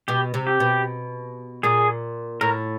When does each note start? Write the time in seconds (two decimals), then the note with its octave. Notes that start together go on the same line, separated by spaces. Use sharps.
0.08 B2 G4
0.34 C3
0.47 G4
0.60 B2
1.63 A#2 G#4
2.41 A2 A#4